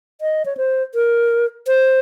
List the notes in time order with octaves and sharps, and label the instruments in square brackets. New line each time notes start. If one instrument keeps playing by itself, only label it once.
[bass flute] D#5
C#5
C5
A#4
C5